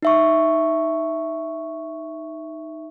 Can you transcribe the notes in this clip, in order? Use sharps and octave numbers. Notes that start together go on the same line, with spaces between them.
D#4 E5 C#6